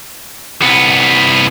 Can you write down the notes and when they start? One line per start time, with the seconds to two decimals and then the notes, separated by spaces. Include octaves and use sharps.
0.62 C2 B3